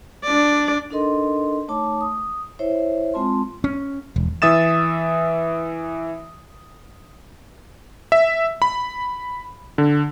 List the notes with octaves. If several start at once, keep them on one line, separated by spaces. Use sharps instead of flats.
D4 D5
D4 D#4 A4 A#4 D#5 C6
A3 D#4 C#5 A5 D6
D#6
E4 C5 C#5 E5
G#3 C4 F4 A5 C6
C#4
E1
E3 E5 D#6 A6 E7
E5
B5
D3